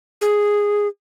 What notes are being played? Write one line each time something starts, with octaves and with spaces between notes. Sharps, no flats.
G#4